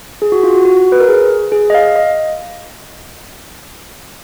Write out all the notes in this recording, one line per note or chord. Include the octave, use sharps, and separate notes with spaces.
G#4
F#4
F4
F#4
F#4
B4
A#4
G#4
G#4
D#5
F5
D#5